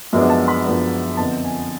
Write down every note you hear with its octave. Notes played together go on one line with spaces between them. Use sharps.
F#2 F3 G#3 B3 D4
A5
B5
F#2 F3 G#3 B3 D4
F2 D3 F3 B3 D4 A5
G#5